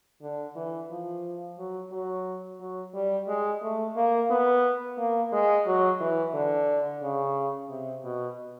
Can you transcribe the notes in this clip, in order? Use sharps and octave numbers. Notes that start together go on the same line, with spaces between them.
D3
E3
F3
F#3
F#3
F#3
G3
G#3
A3
A#3
B3
A#3
G#3
F#3
E3
D3
C#3
C3
B2